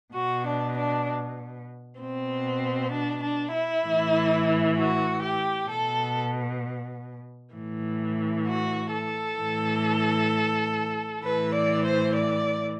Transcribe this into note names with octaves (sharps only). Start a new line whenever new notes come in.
B2 F#4
D4
D4
B2 C4
D4
D4
E4
A2 E3
F#4
G4
B2 A4
A2 E3
F#4
A4
A2 E3
A2 E3 B4
D5
C5
D5